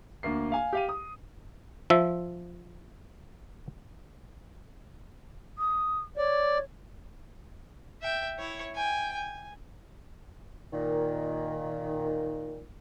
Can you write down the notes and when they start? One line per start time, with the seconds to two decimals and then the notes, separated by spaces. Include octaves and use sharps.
0.23 D2 A#3 C7
0.52 F5 G#5
0.73 G4 F5 D#7
0.89 D#6
1.90 F3 E5
5.58 D#6
6.17 C#5 D5
8.01 E5 G5
8.38 E4 C#5
8.75 G5 G#5
9.14 G#5
10.72 A#2 D#3